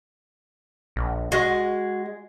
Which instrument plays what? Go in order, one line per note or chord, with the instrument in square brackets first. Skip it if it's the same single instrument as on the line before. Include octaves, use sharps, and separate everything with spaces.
[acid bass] A#1
[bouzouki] G#3 [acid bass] F#4